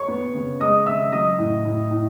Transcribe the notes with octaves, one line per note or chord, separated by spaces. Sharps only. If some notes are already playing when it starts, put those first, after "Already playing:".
Already playing: C#5 C#6
B3
C#3
G#3 D#5 D#6
C#3 E5 E6
F#3 D#5 D#6
A2
A2
A2